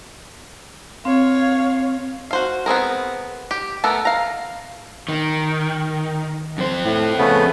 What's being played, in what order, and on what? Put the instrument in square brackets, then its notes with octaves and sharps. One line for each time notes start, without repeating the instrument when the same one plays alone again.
[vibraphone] C4 [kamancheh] C#5 F5
[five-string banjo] F#4 C5 F5
B3 C4 G#4 A#4
G4
A3 B3 A4 A#4
F5 A#5
[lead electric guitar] D#3
F2 C5
[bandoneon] A2
C#3 A3 B3